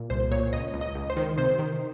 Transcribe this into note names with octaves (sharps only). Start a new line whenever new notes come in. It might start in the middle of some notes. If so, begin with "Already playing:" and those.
Already playing: A#2
C2 C5
A#2 C#5
C#2 D#5
C#2
D#5
C#2
C5
D#3
C3 C5
D#3